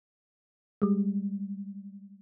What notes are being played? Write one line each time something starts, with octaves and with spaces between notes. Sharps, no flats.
G3 G#3